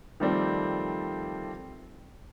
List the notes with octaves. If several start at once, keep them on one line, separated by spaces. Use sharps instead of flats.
D#3 F3 G3 A3 C4 D5